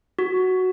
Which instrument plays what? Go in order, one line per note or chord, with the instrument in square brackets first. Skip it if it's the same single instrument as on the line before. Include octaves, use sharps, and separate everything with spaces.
[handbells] F#4